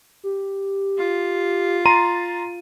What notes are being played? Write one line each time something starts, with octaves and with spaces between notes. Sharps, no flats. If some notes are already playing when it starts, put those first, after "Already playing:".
G4
F4
A#5 C6 A6 D#7